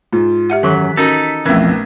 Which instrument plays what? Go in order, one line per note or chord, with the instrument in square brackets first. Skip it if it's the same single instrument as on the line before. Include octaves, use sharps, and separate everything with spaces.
[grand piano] G#2 [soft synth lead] F4
[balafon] G4 E5 F#5
[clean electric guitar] F#2 F#3 [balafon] D#3 E3 A4 [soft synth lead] B6
[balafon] C#4 F#4 A#4 [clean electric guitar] D#4 A4
[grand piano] B1 E5 G#6 [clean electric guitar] F2 E3 [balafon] A3 C#4 [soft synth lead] A#4